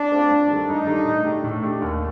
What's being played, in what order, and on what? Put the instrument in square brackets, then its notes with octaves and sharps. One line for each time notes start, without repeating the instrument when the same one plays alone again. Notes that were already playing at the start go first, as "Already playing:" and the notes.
Already playing: [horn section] D4
[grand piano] A3 C4 F4
G2
D#3 G3 D4 A4
[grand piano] G2 [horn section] D#4
[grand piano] D#3 G3 D4 A4
A2
A3 D4 G4
A2
A3 D4 G4
D#2